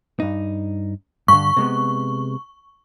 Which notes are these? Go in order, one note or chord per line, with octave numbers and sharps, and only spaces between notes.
G2 D#4
G2 D3 C#6
C3 G#3 B3